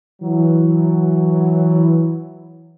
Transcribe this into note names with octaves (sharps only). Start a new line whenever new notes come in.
E3 F#3